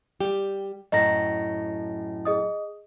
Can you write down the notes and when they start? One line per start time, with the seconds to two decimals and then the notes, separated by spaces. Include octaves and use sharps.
0.21 G3 G4
0.92 F#2 A2 D#5 A#5 A#6
2.25 G#4 D#5 D#6